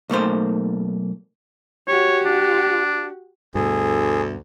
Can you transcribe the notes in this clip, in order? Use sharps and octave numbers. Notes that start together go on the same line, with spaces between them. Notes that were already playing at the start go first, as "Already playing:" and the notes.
B1 A3 A#3 C5
F#4 G4 C#5
D4
D2 G2 B2 G#4 A4